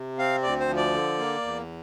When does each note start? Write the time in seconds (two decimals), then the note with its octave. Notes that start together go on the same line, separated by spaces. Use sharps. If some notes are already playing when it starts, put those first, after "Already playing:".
Already playing: C3
0.18 C4 F5
0.43 D2 D5
0.60 C5
0.68 F3
0.77 D5
0.93 D3
1.18 A#3
1.42 E2